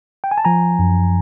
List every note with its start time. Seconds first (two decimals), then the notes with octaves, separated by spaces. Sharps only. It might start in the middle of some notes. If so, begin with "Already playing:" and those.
0.24 G5
0.31 G#5
0.38 A5
0.45 F3 G#5 A#5
0.79 F#2